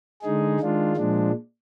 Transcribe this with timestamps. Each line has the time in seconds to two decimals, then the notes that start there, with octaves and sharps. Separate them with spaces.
0.22 D3 G#3 D#4 G#4
0.60 D#3 G#3 D4 F4
0.97 A#2 F3 G#3 D4